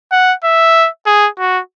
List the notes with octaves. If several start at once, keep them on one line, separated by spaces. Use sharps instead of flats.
F#5
E5
G#4
F#4